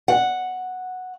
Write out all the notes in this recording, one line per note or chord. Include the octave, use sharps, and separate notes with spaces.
F#5